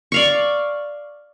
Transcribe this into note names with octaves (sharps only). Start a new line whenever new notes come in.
D5 F5 C#6